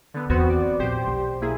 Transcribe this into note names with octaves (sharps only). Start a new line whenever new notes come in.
D3 B3
E2 B3 C4 F#4
D5
A#1 G4 C5
B1
A#3 E4 G#4